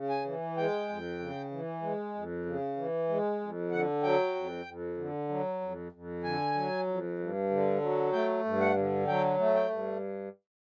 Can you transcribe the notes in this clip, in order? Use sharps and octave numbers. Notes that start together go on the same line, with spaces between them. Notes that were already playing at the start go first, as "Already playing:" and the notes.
Already playing: C#3
G#5
E3
G#3 G5
F2
C#3
E3
G#3
F2
C#3
E3
G#3
F2
D3 F#5
F#3 G5
F2
F2
D3
F#3
F2
F2
D3 G#5
F#3
F2
G2
D3
F#3
A3 G5
G2
F#5
D3
F#3 G5
A3
G5
G2